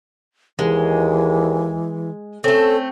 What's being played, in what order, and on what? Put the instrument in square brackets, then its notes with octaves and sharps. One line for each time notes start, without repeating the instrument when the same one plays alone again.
[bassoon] D#2 [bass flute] E3 [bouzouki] G#3
[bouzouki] A3 C4 [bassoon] C#4 [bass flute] A4